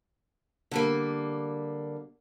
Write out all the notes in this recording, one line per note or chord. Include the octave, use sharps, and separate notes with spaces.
D3 G3 A#3